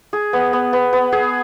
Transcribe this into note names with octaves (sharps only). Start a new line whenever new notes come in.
G#4
B3
B3
B3
B3
G#4